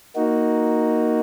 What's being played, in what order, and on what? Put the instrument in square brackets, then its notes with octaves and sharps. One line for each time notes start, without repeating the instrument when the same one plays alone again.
[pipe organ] A#3 D#4 F#4